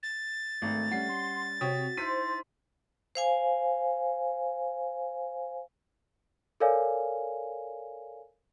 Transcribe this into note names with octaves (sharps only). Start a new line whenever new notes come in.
A6
G#1 A3
G3 C#4 F#5 C7
C6
C3 F#4 C#5 G5 D#6
D#4 E4 C5 C6 B6 D#7
C5 F5 G#5
A4 A#4 C#5 D5 F5 G#5